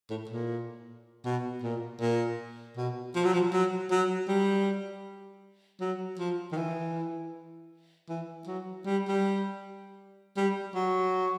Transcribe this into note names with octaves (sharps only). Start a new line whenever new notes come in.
A2
A#2
B2
A#2
A#2
B2
F3
F#3
F3
F#3
F#3
G3
F#3
F3
D#3
E3
E3
F#3
G3
G3
G3
F#3